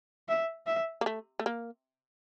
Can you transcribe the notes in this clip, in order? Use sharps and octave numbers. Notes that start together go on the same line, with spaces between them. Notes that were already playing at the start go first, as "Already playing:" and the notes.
E5
E5
A#3
A3
A3
A#3